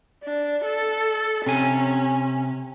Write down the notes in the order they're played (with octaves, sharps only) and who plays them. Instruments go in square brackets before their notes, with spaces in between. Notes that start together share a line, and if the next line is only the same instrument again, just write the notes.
[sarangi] D4
A4
[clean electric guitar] C3 G#5 [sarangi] C#4